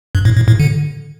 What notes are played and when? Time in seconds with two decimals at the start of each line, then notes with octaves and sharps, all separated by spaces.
0.15 G2
0.25 A2
0.37 A2
0.48 A2
0.60 D3